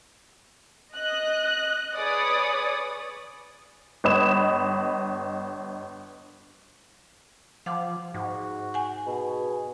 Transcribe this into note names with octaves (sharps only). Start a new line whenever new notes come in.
D#5 F#6
G#4 B4 C#5 D5 D#6
G1 B4 D#5 B5 D#6 E7
F3 F5 F#5 D6
G#2 F#4
F#5 G#5
B2 G#4